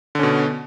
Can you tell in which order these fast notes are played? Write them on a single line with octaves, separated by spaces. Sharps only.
D3 C#4 B2